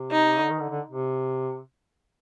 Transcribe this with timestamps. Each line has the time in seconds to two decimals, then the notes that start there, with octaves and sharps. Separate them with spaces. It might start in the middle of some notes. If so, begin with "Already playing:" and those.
Already playing: C3
0.11 D#4
0.40 D3
0.50 D#3
0.59 D3
0.70 D3
0.88 C3